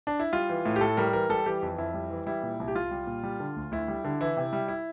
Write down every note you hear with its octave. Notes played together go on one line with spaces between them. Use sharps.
D4
E4
G3 F4
E3
A2
G4
A2 A4
G3 A#4
E3 A#4
G3 A4
E3 G4
F2
F2 E4
G3
E3
G3 E4
A#2
C2
G4
C2 F4
G3
A#2
G3
D3
D2
D2 E4
G3
D3
E3 E4
C3
G3
E4